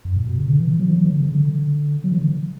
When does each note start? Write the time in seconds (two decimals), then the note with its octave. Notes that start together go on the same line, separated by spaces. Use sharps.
0.05 F#2
0.16 A#2
0.27 B2
0.38 C#3
0.49 D3
0.60 E3
0.71 E3
0.80 F#3
0.88 E3
0.96 F#3
1.05 E3
1.13 D3
1.21 C#3
1.29 D3
2.04 F#3
2.12 E3
2.20 D3